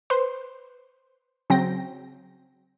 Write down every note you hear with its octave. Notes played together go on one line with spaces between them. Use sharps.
B4 C5 C6
C#3 F#3 C4 G5 A#6